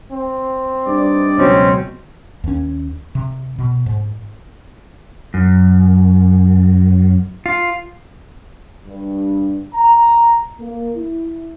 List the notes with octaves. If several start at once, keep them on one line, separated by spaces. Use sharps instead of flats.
C4
G2 D#4 D5
C#2 B2 F#3 C4 C#4
D#2 C#4
C3
B2
G#2
F#2
F4
G2
A#5
A#3
E4